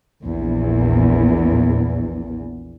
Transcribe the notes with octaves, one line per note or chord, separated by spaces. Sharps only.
A#1 E2